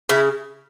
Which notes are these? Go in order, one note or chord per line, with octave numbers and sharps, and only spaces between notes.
C#3 E4